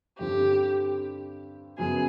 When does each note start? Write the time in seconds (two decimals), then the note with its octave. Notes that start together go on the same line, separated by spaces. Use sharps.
0.19 G2 D3 G3 C4 G4
1.78 F#2 C#3 F#3 B3 G#4